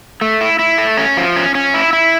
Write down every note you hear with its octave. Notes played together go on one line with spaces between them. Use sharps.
A3
E4
E4
A3
C#4
F3
C#4
C#4
E4
E4